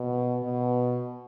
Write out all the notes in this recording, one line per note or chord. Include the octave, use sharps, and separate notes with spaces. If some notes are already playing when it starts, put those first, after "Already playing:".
Already playing: B2
B2